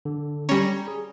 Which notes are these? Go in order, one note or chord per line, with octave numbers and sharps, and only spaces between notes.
D3
G3 C#4 A#5 A#6
G#4